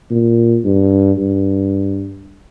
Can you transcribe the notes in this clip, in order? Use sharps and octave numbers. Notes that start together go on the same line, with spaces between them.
A#2
G2
G2